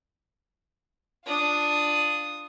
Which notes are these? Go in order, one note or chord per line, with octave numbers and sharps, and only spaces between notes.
D4 F4 D#6